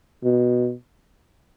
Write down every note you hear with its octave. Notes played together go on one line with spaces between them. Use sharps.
B2